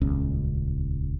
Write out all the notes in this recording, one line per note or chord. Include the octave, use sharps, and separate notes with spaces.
D#1 C#2 C#4